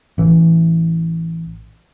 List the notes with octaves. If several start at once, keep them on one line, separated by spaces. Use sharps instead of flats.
A1 E3